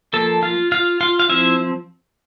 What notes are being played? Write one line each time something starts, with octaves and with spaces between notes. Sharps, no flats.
F3 A#3 A4 A5
F4 F5
F4 F5
F4 F5
F5
F3 C4 E4 E5